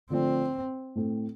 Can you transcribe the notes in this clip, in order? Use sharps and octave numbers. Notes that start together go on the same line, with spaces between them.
D3 F3 A3 C4 D4
A2 A3 C4